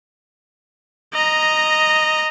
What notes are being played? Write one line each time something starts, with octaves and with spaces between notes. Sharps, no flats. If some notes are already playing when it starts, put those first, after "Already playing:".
D#5 A#5